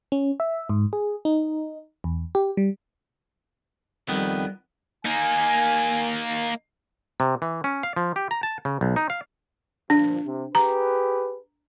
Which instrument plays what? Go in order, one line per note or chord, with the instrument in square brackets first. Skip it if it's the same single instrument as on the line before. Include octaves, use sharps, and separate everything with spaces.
[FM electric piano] C#4
E5
G#2
G#4
D#4
E2
G4
G3
[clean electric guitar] F2 D#3 B3 [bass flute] G3
[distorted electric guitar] A#3 D#4 [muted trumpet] G#5
[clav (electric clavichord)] C3
E3
C#4
F5
F3
G4
A#5
A5
C#3
B1
D#4
F5
[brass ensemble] G1 A#2 F3 [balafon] D4
[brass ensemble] C3
[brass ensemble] G4 G#4 B4 [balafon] A#5